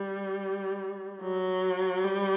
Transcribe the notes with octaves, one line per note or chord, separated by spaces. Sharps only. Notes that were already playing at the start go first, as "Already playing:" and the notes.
Already playing: G3
F#3
G3